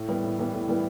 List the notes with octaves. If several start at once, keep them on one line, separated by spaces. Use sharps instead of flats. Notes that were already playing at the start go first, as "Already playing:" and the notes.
Already playing: A2
E3 G3 B3
A2
E3 G3 B3
A2
E3 G3 B3